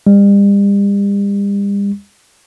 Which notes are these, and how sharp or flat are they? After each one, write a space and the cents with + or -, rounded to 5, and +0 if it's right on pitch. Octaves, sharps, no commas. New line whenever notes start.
G3 +40